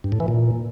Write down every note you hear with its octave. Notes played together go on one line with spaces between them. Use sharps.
G2
A2
E3
A#2